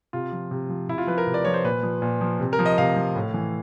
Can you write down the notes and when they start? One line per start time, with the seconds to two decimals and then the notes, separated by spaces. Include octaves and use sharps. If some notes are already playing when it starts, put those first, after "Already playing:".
0.13 C3 F4
0.32 F3
0.51 C3
0.69 F3
0.89 C3 E4
0.98 F4
1.07 F3 B4
1.18 A#4
1.27 C3
1.34 D5
1.45 F3 C#5
1.54 C5
1.64 A#2 B4
1.83 F3
2.02 A#2
2.21 F3
2.40 C3
2.53 A#4
2.59 F3
2.66 D#5
2.78 C3 F5
2.96 F3
3.15 A2
3.34 E3